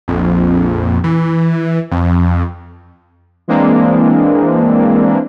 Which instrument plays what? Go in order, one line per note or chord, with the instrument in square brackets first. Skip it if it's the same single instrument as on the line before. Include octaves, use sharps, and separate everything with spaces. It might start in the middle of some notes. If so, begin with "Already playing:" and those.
[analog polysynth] A#1 F2
E3
F2
E3 G#3 A#3 C4 D4